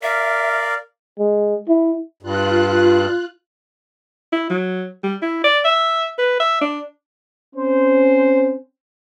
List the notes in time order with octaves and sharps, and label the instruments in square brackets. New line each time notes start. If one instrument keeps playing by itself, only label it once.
[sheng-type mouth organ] A#4 D5 F5 [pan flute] E5
[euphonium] G#3
E4
[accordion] G2 [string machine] F4 F#6
[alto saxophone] E4
F#3
G3
E4
D5
E5
B4
E5
D4
[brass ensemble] C4 C#4 C5